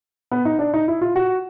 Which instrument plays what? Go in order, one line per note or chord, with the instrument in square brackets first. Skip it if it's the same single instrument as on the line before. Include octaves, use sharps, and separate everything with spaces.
[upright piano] B3
D#4
D4
D#4
E4
F4
F#4